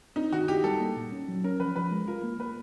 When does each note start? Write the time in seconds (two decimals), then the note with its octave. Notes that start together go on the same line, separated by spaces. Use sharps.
0.16 C4 D#4
0.33 D#3 F#4
0.48 E4 G4
0.64 G3 A4
0.80 A#3
0.96 A#2
1.12 C#4
1.28 F#3
1.44 C#4 A#4
1.60 F3 B4
1.76 F3 B4
1.91 G#3
2.08 F4 A#4
2.23 A#3
2.39 A#3 B4